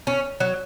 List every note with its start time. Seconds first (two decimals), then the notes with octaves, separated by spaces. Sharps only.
0.07 C#4
0.40 F#3